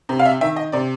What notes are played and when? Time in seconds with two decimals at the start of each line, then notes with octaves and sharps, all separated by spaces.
0.09 C3
0.19 F5
0.25 E5
0.41 D#3 E5
0.56 D#5
0.72 C3 D5